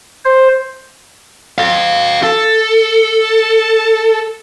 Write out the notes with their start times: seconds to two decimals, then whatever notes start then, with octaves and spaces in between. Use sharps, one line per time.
0.25 C5
1.58 A4 F5
2.23 A4